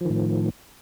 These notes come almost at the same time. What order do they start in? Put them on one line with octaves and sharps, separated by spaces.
F3 D#3 A2